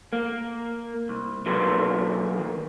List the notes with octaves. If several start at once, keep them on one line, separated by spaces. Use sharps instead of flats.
A#3
C2
B1 D3 F#3 A#3 B4 C6
D#3